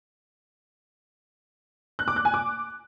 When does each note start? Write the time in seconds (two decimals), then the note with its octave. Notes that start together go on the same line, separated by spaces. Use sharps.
1.99 F#6
2.08 D6
2.16 F#6
2.25 G#5
2.34 D6